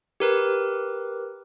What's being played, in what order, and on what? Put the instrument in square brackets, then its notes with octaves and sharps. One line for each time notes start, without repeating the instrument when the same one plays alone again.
[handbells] G4 A#4 B4